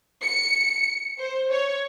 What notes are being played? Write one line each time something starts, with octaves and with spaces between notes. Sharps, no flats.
C#7
C5
C#5